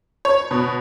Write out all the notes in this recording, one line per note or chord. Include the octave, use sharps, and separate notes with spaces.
C#5
B2